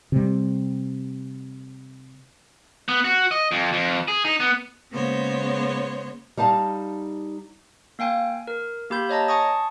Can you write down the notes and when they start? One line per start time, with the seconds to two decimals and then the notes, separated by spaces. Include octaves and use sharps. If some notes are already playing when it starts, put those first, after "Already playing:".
0.12 C3 G3
2.88 B3
3.05 F#4
3.31 D#5
3.52 F2
3.73 F2
4.08 G#4
4.25 D#4
4.40 B3
4.91 C#3 G#3 A#3 B3 C5 C#5
6.37 G3 D#4 F5 A5
7.99 A#3 F5 G5 G#5
8.47 A#4
8.90 A#3 G4 B5 G6
9.09 C#5 D#5 A5 A#5
9.28 G#5 A5 C#6 D#6